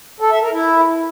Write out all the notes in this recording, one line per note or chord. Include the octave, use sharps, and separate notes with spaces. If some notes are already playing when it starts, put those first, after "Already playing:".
A4
E5
A#4
E4